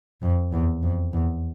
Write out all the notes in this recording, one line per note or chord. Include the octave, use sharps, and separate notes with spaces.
F2
E2
F2
E2